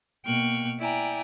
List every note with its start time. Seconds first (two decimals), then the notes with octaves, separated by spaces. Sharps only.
0.25 B2 A#3 G5 C#6 F6 F#6
0.78 E4 D5 G5 G#5 A#5